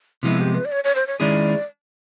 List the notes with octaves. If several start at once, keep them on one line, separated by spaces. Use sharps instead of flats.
C3 F3 G#3 B3 E4
G4
B4
D5
C#5
C#5
C5
C#5
D#3 G#3 C#4 E4 G#4 D5